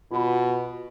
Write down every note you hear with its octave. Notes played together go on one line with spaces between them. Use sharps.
B2 F4 F#4 B5